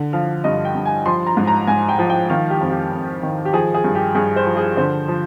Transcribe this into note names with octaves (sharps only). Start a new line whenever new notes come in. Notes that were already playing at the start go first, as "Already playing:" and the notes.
Already playing: D3
F3 F5
G2 D#5
G5
G2
G#5
F3 C6
A#5
G#2
A#5
G#2 G#5
G5
F3
G5
D#3 F5
G4
F2
G4
F2
D#3
G4
F3 G#4
G#4
G2
G4
G2 G#4
C5
F3
G#4
D3 C5
F3